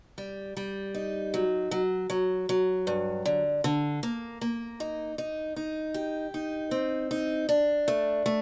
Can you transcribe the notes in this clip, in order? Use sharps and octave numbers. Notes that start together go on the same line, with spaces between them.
G3
G3
D#4
F#3
F#3
F#3
F#3
G2
D3
D3
A#3
A#3
D#4
D#4
D#4
G4
D#4
C4
D#4
D4
A3
A3